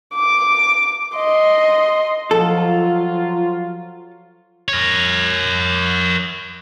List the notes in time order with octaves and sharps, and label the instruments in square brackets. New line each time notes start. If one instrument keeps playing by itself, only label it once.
[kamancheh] D6
D#5 C6
[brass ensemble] F3 F#3 F4 [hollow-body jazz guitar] A4
[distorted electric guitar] A#4 C#5